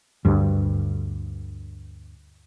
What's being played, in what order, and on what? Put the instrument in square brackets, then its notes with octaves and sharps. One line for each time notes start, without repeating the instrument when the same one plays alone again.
[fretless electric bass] D2 G2